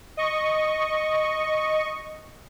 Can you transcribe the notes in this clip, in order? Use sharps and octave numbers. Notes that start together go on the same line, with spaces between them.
D#5 C#6